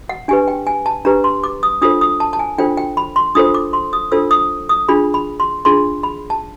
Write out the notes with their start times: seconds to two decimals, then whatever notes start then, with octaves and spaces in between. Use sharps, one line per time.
0.09 F#5
0.28 D4 G4 B4 G#5
0.48 G5
0.67 G#5
0.86 A5
1.05 D4 G4 B4 A#5
1.24 C6
1.44 D6
1.63 D#6
1.82 D4 F4 A4 C5 D#6
2.01 D#6
2.20 A5
2.33 A5
2.39 G#5
2.58 D4 F4 A4 C5 G5
2.77 G5
2.97 B5
3.16 C6
3.35 D4 F4 A4 C5 D#6
3.54 D6
3.73 C6
3.93 D#6
4.12 D4 F4 A4 C5 E6
4.31 D#6
4.69 D#6
4.88 D4 F4 G#4 B5
5.14 B5
5.40 C6
5.65 D4 F4 G#4 C6
6.03 B5
6.30 A5